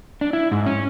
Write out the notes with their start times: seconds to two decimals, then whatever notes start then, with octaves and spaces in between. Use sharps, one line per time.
0.21 D4
0.33 E4
0.52 G#2
0.66 C#4